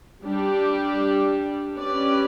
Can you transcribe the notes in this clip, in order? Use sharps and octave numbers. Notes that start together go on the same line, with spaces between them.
G3 D4 G4
C#4 G4 B4 D5